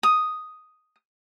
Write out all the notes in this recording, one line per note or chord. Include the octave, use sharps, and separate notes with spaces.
D#6